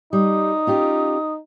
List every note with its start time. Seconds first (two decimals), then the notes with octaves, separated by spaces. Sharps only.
0.13 G3 D#4 D#6
0.67 C#4 F4 G4